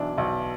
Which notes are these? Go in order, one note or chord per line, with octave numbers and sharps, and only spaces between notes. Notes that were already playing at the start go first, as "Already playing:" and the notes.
Already playing: B1 E3 D4
B1